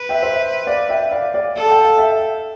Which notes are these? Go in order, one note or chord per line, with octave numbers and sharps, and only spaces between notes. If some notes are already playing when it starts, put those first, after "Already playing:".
Already playing: B4
E5 G5
C5 E5
D5 F5
E5 G5
D5 F5
D5 F5
A4
G5
F5
E5 G5